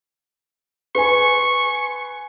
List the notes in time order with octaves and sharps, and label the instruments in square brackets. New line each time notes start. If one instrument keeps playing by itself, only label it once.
[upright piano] B4 G#5 [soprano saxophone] C#6